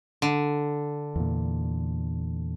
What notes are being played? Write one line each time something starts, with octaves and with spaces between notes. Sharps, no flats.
D3
E2 A#2